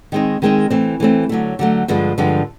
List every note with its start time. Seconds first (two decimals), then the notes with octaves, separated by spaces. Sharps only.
0.12 D#3 G#3 C4 D#4
0.42 D#3 G#3 C4 D#4
0.70 E3 A3 C4
1.00 E3 A3 C4
1.29 D3 F#3 A3
1.59 D3 F#3 A3
1.88 G2 D3 F3 G#3
2.18 G2 D3 F3 G#3